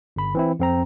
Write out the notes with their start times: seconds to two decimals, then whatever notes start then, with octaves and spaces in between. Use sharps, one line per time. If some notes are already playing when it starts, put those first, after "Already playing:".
0.16 G1 B5
0.35 E3 C4 E4
0.60 F2 C4 A#5